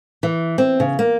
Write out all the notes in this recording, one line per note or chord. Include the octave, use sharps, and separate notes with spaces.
E3
C4
C#3
A#3